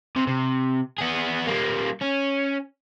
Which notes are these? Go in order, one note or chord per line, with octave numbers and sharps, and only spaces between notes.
C3
C3
B3 G#4
G3 A#3
C#4